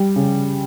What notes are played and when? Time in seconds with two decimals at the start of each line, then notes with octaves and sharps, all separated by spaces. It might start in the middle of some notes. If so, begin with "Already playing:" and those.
Already playing: G3
0.16 C#3